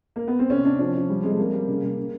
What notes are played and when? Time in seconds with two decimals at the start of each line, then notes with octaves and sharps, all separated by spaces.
0.16 A#3
0.28 B3
0.39 C4
0.50 C3 C#4
0.65 C3 D4
0.79 F3 C#4
0.95 F3
1.09 G3
1.23 C3 G#3
1.31 A3
1.39 C3 A#3
1.53 G3
1.68 C#3
1.83 C#3
1.97 C#3